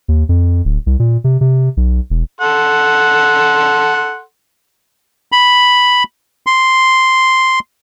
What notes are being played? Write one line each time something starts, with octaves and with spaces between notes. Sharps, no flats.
D#2
F2
D1
C2
A#2
C3
C3
B1
E1
A4 F#5 C6
B5
C6